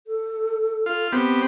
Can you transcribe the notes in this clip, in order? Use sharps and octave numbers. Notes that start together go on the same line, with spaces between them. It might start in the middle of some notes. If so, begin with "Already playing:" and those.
A4
F4
B3 C4 G4